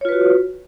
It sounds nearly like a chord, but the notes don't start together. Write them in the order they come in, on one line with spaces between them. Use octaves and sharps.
C#5 F4 B4 F#4